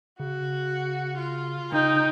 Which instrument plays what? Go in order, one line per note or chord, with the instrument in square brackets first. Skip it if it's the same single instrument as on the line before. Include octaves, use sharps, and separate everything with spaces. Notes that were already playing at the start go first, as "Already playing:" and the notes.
[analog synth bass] C#3 [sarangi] F#4
[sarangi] F4
[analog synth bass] C#3 [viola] D#4 [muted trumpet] G5